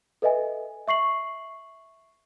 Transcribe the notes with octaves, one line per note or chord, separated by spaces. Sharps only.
A4 B4 D#5 E5 G#5
E5 C#6 C7 F#7